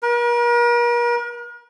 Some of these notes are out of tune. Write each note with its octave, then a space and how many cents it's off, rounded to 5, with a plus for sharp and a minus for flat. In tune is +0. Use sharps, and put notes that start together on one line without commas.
A#4 +40